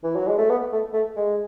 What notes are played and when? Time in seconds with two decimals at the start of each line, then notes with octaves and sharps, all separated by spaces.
0.04 E3
0.16 F#3
0.28 G#3
0.38 A3
0.50 B3
0.72 A3
0.94 A3
1.16 G#3